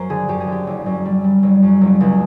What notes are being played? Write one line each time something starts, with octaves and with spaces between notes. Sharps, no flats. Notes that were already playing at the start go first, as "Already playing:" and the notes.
Already playing: F#2 A#4 C5
D3 G#4
F#2 G4
G#4
D3 G4
F#1
F#2
G3
G3
F#1
F#2
F#1
C#2